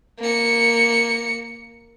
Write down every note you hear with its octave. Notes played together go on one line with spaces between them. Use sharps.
A#3 C#7